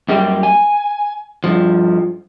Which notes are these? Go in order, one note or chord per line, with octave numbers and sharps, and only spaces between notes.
F#2 G3 A#3 G4
G#5
G2 F3